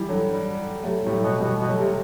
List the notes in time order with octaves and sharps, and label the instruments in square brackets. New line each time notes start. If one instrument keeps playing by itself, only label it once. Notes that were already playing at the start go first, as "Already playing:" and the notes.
Already playing: [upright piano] E3 G3
D3 F#3
[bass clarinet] G3
[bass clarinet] C3 [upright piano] F#3 A3
[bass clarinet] A2 [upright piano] G3
[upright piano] F#3 A3
[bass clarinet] B2
[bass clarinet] B2 [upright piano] E3 G3
[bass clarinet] B2
[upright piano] F#3 A3
[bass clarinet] C3